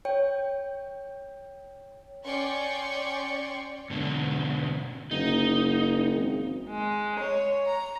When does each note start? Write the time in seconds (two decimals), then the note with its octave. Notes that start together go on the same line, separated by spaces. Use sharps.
0.05 C#5 G5
2.26 C#4 D5 G5 C6 C#6
3.90 G#2 B2 D3
5.11 F#1 D#4
6.15 G#1
6.69 G#3
7.19 C#5
7.67 A#5